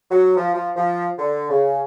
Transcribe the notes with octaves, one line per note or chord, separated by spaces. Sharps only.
F#3
F3
F3
F3
D3
C#3